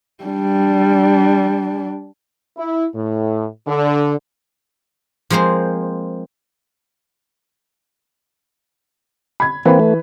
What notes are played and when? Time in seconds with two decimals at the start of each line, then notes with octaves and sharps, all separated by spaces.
0.24 G3 D4
2.58 E4
2.94 A2
3.67 D3
5.30 F3 G#3 A#3 C4 C5
9.40 B5 G#6
9.65 E3 A#3 C4 B4 B5
9.80 A3